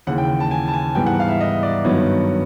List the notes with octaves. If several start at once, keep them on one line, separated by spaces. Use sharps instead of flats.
D#2 C#3 E3 F#5
G5
A5
G#5
A5
G#5
G#2 E3 G3 B3 G5
F#5
F5
E5
D#5
D5
G2 D#3 F#3 B3 C#5